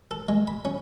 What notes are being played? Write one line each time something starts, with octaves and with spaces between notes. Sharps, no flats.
A4
G#3
B5
C#4